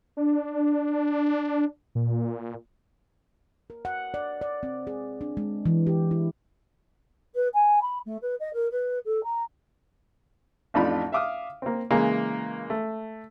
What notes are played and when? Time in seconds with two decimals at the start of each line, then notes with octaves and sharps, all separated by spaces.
0.17 D4
1.95 A#2
3.70 A#4
3.85 F#5
4.14 D5
4.41 D5
4.63 C4
4.87 G#4
5.21 D4
5.37 G#3
5.66 E3
5.87 G4
6.11 E4
7.34 B4
7.53 G#5
7.81 B5
8.05 A3
8.21 B4
8.40 D#5
8.53 A#4
8.71 B4
9.05 A4
9.23 A#5
10.74 A1 F2 D4 D#4 F4 B5
11.12 E5 F5 D6 D#6 F6
11.62 A#3 C4
11.91 C#3 E3 G#3 A#3
12.70 A3